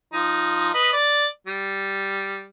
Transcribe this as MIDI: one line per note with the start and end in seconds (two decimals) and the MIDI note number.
0.13 0.71 53
0.13 0.71 63
0.74 0.91 71
0.74 0.91 75
0.93 1.26 74
1.47 2.45 55